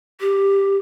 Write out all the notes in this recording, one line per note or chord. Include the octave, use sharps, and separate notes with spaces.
G4